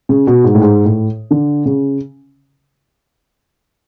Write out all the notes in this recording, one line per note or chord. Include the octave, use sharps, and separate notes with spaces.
C#3
B2
G#2
A2
G#2
A2
D3
C#3